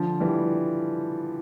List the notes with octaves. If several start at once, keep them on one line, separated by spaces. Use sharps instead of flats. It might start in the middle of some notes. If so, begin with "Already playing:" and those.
Already playing: D3 F3
E3 G3